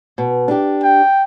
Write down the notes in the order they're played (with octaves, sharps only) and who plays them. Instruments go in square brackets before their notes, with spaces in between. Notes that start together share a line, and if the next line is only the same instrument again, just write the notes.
[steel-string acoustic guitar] B2
D4 G4
[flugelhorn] G5